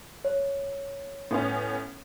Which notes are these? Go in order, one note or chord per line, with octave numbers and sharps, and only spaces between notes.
C#5
A2 B3 C#4